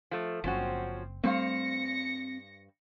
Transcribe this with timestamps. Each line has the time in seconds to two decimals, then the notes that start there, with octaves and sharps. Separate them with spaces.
0.11 F3 A3
0.44 F#1 F3 C4 C#4 F#4
1.24 G2 G3 A3 C4 C5 F5 A#6 C#7